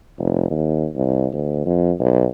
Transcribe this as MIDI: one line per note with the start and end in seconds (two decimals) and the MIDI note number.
0.19 0.46 29
0.51 0.88 39
0.96 1.27 36
1.34 1.63 38
1.66 1.92 41
2.00 2.27 35